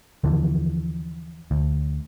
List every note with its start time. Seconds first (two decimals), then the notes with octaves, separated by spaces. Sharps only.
0.24 D#2 D3 E3 F3
1.51 D2